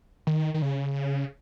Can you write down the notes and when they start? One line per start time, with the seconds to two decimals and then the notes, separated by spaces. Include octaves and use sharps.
0.27 D#3
0.54 D#3
0.62 C#3